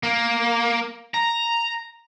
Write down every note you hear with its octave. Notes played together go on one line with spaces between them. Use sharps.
A#3
A#5